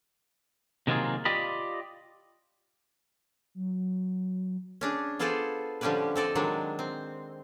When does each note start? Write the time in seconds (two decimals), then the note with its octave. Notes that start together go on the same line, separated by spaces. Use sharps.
0.87 C3 D#3 F#3 A#3 F4 G#4
1.25 F4 G4 D5 D#5 B5
3.55 F#3
4.81 C#4 D4 G#4
5.19 B3 F4 G#4 A4 C5 D5
5.81 D3 F3 G3 C#4 G4 B4
6.16 C4 A4 D5 D#5
6.35 D#3 F#3 G#3 D4
6.79 C4